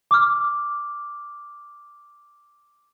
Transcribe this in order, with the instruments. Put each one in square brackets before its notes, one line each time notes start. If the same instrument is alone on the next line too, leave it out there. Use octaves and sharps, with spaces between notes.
[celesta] D6 F6